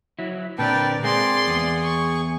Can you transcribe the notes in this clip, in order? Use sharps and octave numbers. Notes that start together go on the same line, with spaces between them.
F#3 E4
A#2 D3 C4 A#4 B4 D5 G5 A5
G#3 A#3 C4 G#4 D5 C6
E2 B3
C#6